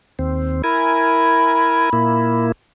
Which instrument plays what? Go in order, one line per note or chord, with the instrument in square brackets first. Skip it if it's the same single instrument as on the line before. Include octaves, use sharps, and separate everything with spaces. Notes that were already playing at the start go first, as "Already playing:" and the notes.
[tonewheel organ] D#2 C4
[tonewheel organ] E4 A#4 G#5 [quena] B5
[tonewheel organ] A#2 A#3 E4